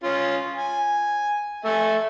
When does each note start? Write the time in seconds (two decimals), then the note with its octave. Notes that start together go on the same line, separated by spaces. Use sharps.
0.04 C#4 F4
0.57 G#5
1.65 A3 E5 G#5